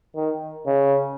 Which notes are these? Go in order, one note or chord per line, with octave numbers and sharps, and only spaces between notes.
D#3
C#3